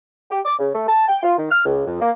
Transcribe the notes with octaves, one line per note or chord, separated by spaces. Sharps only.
G4
D6
C#3
A3
A5
G5
F4
D#3
F6
C#2
F2
A#3